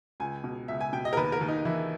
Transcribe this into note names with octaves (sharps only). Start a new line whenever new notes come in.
C#2 G#5
B2
C#2 E5
G#5
B2 G5
D#5
A#4
D#2 B4
A#4
D#2
D#4
E3 E4